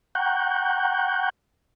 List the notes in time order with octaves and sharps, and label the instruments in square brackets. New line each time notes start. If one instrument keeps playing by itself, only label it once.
[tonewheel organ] F#5 G5 A#5 C#6 F#6 G6